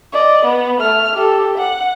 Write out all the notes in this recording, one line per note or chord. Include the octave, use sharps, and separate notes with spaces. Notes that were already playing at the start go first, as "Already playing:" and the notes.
D5 D#5
B3
A3 F6
G4 A4
F#5